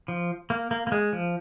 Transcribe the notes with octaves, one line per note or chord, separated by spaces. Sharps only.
F3
A#3
A#3
A#3
G#3
F3